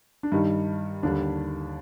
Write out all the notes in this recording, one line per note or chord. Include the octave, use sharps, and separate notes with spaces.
D4
G2 D#3 G3 D#4
D#2 D3 G3 D4